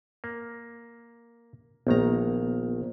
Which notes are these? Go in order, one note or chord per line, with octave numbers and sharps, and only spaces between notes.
A#3
A#1 D#3 A#3 B3 A#5